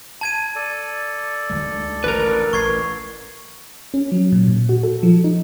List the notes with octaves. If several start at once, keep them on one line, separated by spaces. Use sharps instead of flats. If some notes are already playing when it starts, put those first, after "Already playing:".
A5 G#6 D#7
A4 D5
D2 D#3 G#3
A1 D2 A#4 B4
A1 C#6 G#6 C7
C#4
F#3
A#2
A#2
F#4
A4
F3
D#4